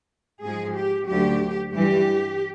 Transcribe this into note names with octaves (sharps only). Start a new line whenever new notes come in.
G#2 F3 G#3 G#4
G4
D2 D3 F#3 G4
G2 E3 G3 G4